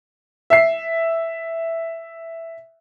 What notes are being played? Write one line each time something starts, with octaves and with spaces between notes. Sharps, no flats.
E5 C7